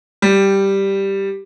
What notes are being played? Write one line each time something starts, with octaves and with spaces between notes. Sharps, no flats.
G3